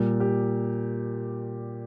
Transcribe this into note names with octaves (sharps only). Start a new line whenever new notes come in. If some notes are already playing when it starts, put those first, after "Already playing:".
Already playing: A#2 G3
G4